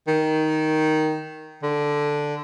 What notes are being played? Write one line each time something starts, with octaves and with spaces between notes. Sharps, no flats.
D#3
D3